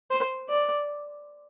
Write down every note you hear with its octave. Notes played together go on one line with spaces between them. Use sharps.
C5
D5